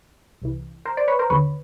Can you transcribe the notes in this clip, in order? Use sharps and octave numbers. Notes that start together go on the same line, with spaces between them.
C2 C3 E3
A#4 C5
C5 D5
B4 C#5
A#4 C5
D#2 D3 B4 C#5